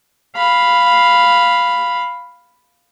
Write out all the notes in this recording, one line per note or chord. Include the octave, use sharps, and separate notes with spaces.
F5 B5